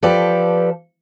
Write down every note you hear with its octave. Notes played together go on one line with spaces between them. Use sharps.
F3 G4 A4 B4 D5